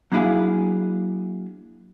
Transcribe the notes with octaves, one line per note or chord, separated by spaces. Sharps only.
F#3 A#3 D4 E4 G#4 F5